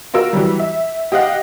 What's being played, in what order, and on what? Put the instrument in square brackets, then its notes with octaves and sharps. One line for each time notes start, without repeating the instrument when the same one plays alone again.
[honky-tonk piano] F4 F#4 A#4 E6
E3 F#3 G3
E5
G4 D#5 F5 F#5